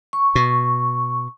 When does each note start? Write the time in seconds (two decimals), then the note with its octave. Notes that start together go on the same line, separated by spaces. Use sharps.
0.13 C#6
0.35 B2